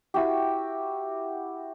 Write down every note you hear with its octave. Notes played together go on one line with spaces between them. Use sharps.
E4 F#4 G4